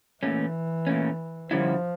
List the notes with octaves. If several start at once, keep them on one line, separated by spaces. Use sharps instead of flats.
A#2 E3 A3 C#4
A#2 A3 C#4
D3 F3 G3 C#4 E4